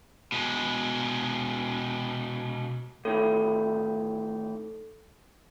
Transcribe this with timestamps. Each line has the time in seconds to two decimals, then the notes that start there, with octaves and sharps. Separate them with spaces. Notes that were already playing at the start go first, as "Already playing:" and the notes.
0.32 B2 G#3
3.05 A2 D#3 E3 A4